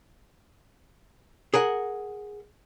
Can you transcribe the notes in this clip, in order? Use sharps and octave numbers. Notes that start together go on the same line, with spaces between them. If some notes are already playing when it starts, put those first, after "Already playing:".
G#4 A#4 F#5